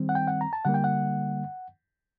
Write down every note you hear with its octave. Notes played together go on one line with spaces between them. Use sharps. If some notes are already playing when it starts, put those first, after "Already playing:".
Already playing: D#3 G3 C4
F#5
G5
F#5
A#5
A5
D3 G3 A#3 F#5
G5
F#5